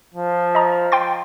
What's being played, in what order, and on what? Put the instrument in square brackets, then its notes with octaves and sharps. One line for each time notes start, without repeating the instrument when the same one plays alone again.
[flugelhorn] F3
[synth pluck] D#5 A#5
G5 C6 A6